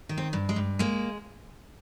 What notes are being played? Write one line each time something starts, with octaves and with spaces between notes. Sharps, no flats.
D#3
C4
G2
G#3
G2
G#3 A#3